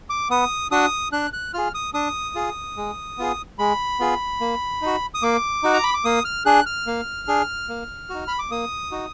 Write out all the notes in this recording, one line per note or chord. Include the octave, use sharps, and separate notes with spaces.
D6
B3 D#6
D4 F#4 D#6
D4 F#6
F#6
F4 G#4 F6
D#6
D4 D#6
F4 G#4
G#3
B3 F4 G#4
G#3 B5
B3 F4 G#4
A#3
D#4 F#4
D#6
A#3 D6
D#4 F#4
A#5
B5
D6
A#3 D#6
F6
D4 G#4 F#6
F6
A#3
D4 G#4
A#3
D#4 F#4
B5
D6
A#3 D#6
D#4 F#4